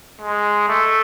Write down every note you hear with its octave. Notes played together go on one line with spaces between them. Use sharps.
G#3
A3